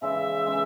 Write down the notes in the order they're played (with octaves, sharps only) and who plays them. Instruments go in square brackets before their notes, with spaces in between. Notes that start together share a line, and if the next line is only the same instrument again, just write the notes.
[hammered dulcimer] C#3 E3 G#3 [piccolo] E5
[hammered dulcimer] C#3 E3 G#3